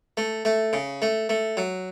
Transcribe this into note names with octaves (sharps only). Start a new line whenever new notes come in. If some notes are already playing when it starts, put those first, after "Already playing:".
A3
A3
C#3
A3
A3
F#3